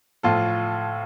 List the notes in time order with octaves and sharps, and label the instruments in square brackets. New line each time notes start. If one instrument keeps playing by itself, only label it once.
[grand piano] A2 F3 F4 A4